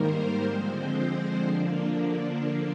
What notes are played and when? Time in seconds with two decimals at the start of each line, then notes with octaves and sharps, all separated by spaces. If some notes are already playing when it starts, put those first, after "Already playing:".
Already playing: G#2 D#3 G3 A#3 A#4 C5
0.45 D3 F3 G#3 C4 C5
0.95 C5
1.47 D3 F3 A#3 D4